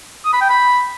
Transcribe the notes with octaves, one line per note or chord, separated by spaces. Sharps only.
D#6
B5
G5
B5